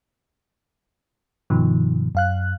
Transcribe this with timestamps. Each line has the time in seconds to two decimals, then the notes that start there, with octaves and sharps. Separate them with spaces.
1.50 G2 B2 D#3 F3
2.15 F#2 F5 F#6